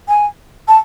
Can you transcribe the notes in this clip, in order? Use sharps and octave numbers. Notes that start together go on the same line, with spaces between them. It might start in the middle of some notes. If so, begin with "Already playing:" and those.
G#5
A5